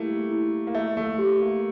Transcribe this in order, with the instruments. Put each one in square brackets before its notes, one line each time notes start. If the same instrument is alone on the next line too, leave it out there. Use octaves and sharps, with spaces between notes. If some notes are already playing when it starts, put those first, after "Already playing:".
Already playing: [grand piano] G3 A3 A#3 [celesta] E4
[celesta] E4
[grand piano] A#3
[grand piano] A3 [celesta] E5
[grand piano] A3
[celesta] G4
[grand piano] A#3